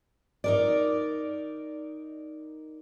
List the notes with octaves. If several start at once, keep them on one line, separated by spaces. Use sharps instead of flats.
D#4 A#4 D5